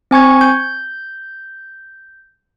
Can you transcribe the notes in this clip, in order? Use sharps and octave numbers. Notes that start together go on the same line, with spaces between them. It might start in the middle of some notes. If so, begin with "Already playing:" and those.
C4 G#5 C#6 G#6
G6